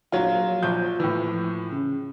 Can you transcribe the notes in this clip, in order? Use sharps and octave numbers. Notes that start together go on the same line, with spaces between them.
A#1 F#3 F4
A#1 F3 G6
A2 E3
C#3